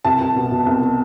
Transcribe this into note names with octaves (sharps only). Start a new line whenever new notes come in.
C2 A5
C2
B2
B2
C2